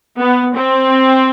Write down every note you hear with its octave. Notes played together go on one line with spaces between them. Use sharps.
B3
C4